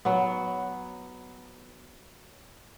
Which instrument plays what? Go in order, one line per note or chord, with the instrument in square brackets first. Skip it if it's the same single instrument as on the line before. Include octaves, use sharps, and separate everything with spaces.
[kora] F#3 B3